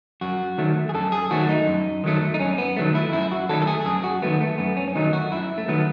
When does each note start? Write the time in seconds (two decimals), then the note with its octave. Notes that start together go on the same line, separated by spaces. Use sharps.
0.21 F#2 F#4
0.58 D#3 F#3 A3
0.89 G#4
0.94 F#2 A4
1.12 G#4
1.31 D#3 F#3 A3 F#4
1.49 D#4
1.68 F#2
2.04 D#3 F#3 A3
2.34 D#4
2.40 F#2 C#4
2.58 B3
2.77 D#3 F#3 A3
2.95 E4
3.12 F#2 E4
3.31 F#4
3.49 D#3 F#3 A3 A4
3.62 A4
3.67 G#4
3.86 F#2 G#4
4.04 F#4
4.22 D#3 F#3 A3 B3
4.41 A3
4.58 F#2 B3
4.77 C#4
4.88 C#4
4.95 D#3 F#3 A3 D#4
5.13 F#4
5.32 F#2 E4
5.58 A3
5.68 D#3 F#3 A3 B3